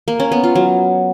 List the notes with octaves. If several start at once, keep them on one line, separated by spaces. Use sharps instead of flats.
A#3
C#4
B3
F4
F#3